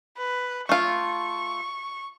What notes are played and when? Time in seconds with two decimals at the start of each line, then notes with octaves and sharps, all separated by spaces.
0.17 B4
0.69 A3 F4 C#6